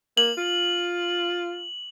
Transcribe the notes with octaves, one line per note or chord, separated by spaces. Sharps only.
A#3 F#7
F4